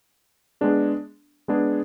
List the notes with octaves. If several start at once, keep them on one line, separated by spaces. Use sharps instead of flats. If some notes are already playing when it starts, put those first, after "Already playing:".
G#3 B3 D4 G#4
G#3 B3 D4 G#4